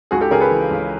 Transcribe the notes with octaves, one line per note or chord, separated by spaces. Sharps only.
C#2 F#4 G#4
G4 A4
C#3 G#4 A#4
A4 B4
E3
C#2